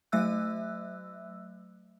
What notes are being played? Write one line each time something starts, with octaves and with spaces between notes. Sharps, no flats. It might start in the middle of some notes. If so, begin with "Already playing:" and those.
F#3 A3 E5 E6 F#6